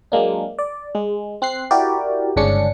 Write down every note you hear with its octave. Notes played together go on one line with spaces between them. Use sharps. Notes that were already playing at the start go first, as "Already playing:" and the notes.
F#3 G#3 A#3 D4
D5
G#3
C4 F#6 C7
E4 F#4 G4 A#4 D5
G1 G#2 C#3 C#4 D4 C#7